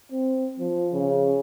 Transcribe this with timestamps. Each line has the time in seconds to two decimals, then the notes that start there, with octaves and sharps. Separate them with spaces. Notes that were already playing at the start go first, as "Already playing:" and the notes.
0.12 C4
0.59 F3
0.93 C#3